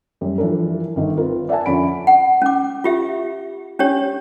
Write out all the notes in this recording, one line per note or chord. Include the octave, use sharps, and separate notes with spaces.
F#2 G3
E3 F3 D4 A4 A#4
G1 D#3 D#4
C4 F4 A#4 B4
D5 E5 F#5 G#5 A5
F2 D3 C#4 B5 D7
F#5
C#4 D6
F4 G4 E5
C#4 D4 G4 C#5